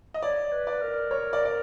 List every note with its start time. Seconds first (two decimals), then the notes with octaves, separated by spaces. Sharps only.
0.14 D#5
0.22 C#5 D5
0.52 B4
0.67 D5
0.82 A#4
1.11 C#5
1.33 D5
1.45 D5